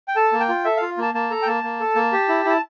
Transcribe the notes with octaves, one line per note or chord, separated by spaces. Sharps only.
G5
A4 A5
A#3
G5
F4
A4 E5
F4 F5
A#3 A5
A#3 A5
A4 A#5
G5
A#3 A5
A#3
A4
A#3
G4
E4
E4 A5